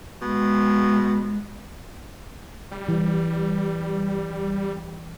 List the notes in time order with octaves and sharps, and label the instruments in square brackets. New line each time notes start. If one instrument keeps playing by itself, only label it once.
[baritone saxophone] B2 [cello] G#3
[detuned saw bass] G3
[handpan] E3